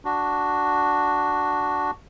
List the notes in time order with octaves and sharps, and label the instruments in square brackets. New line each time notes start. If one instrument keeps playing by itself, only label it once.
[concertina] D4 F#4